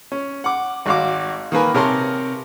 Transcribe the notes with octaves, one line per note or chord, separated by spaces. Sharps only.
C#4
F#5 D6
G#1 F#4 F5 D6
D#3 A#3 B4 G#5
C3 A#4 C#5 A5 C6 F6